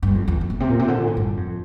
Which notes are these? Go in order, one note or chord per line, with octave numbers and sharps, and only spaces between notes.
G2
F2
E2
F2
A2
C3
A#2
C3
D3
A#2
A2
G2
F2